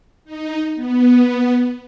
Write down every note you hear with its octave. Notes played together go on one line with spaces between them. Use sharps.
D#4
B3